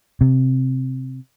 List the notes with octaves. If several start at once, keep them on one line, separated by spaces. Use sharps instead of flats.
C3